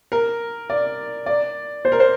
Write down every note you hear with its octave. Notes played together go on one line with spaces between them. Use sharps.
A#4
D5
D5
C5
A#4
C5